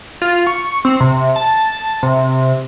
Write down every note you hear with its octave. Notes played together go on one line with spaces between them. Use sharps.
F4
C#6
C4
C3
A5
C3